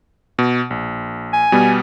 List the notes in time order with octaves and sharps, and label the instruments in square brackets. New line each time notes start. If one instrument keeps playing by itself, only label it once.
[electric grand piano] B2
A#1
[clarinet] G#5
[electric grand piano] B2 G3 B3